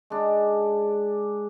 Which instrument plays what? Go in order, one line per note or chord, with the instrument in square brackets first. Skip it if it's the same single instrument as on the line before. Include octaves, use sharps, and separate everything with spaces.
[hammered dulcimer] G#3 D4